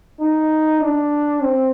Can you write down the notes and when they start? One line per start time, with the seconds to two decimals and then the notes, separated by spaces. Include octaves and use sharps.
0.20 D#4
0.81 D4
1.42 C4